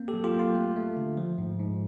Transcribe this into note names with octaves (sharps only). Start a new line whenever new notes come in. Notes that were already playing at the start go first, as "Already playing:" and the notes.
Already playing: A#3 C4
G4 A4
F#3
F4 G4
A#3 F4
A3
A3
D3
F3
G#2
G#2